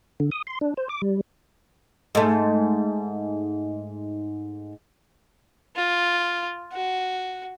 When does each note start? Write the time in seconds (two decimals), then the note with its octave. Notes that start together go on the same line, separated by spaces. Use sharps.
0.20 D3
0.31 D#6
0.47 C6
0.61 D4
0.77 C5
0.89 D6
1.02 G3
2.15 G#2 A3
5.76 F4
6.73 F#4